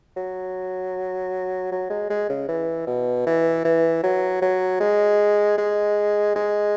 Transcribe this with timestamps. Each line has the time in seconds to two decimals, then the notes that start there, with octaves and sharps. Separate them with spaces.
0.17 F#3
1.72 F#3
1.90 G#3
2.10 G#3
2.29 C#3
2.48 E3
2.87 B2
3.26 E3
3.65 E3
4.03 F#3
4.42 F#3
4.80 G#3
5.58 G#3
6.35 G#3